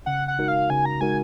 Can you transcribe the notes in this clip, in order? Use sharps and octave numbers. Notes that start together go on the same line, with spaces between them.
C#3 F#5
F#5
G#3 D#4 F#4 A#4
F5
C#3 G#5
A#5
G#3 D#4 F#4 A#4 G#5